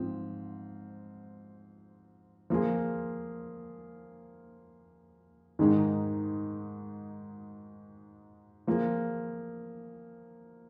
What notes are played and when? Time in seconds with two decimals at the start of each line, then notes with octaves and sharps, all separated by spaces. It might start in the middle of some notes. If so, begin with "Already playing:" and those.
Already playing: G#2 F3 C4
2.50 F3 A#3 F4 G#4
5.59 G#2 D#3 G#3 D#4 G#4
8.67 F3 A#3 G#4